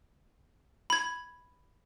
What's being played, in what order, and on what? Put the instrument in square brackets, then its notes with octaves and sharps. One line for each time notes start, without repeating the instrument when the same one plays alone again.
[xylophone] B5 G#6